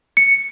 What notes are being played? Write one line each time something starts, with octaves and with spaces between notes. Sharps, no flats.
C#7